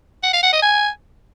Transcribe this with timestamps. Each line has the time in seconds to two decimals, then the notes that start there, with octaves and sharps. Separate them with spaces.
0.23 F#5
0.33 F5
0.43 F#5
0.53 D#5
0.62 G#5